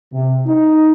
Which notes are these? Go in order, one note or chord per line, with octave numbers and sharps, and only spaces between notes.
C3
D#4